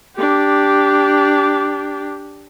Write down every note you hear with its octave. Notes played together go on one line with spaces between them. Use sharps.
D4 G4